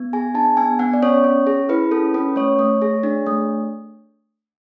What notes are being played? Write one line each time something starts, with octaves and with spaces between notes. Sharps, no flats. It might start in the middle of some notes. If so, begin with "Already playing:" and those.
Already playing: B3
G#4 G#5
D4 A5
B3 G#5
B3 F#5
D5
C#4 C#5
C#4
G#4
E4 B4
C#4 A4
C#4 B4
A3 C#5
A3
G#4
D4
A3